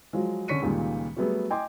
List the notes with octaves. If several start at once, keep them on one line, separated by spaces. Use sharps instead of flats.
F3 F#3 G#3
D3 C#4 C#6 B6 C#7 D#7
C#2 A#2 D#3 G3 G#3
F#3 G3 A3 B3 G#4
D#5 G5 G#5 C6 D6